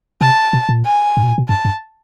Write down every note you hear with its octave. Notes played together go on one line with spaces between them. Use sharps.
C3 A5
B2
A#2
G#5
G#2
B2
A#2
B2
G2 A5
G2